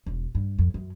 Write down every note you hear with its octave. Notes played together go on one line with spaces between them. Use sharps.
E1
G2
F2
F#2